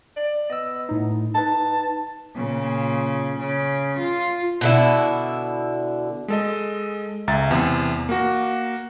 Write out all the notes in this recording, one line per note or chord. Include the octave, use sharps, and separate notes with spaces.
D5
B3 D#5 E6
A2 D#4
D#4 B4 A5
A#2 C#3
C#3
F4
B2 D3 E4
G#3 A4 D#5
C#2 E5 A#5 A6
E2 C3
A#3 F#4